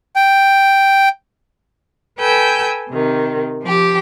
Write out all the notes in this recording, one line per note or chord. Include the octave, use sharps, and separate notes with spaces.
G5
A4 B4 G5 G#5 E6 G6
C3 D#3
F3 G4